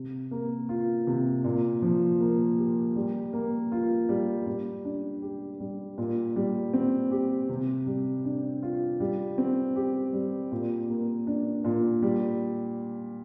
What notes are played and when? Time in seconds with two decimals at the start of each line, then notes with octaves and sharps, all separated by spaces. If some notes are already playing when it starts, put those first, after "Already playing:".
Already playing: C3
0.31 A#3
0.69 F4
1.07 C3
1.44 A#2
1.82 F3
2.20 A#3
2.58 G4
2.96 G3
3.33 A#3
3.72 F4
4.09 G3
4.47 G3
4.85 D4
5.22 G4
5.60 G3
5.98 A#2
6.36 G3
6.73 C4
7.11 G4
7.49 C3
7.87 G3
8.25 D4
8.63 F4
9.00 G3
9.38 C4
9.76 G4
10.13 G3
10.52 A#2
10.89 A#3
11.27 D4
11.64 A#2
12.02 G3